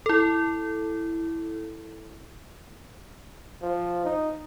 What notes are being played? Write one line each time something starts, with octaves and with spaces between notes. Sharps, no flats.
E4 A4
F3
D#4